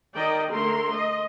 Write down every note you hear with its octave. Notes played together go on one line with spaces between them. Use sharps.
D#3 D5 D#5 G5
D3 A3 A#4 C6
D#5